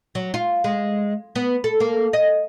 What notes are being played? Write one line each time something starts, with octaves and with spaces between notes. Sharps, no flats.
F#3
F4
G#3
B3
A4
A#3
D#5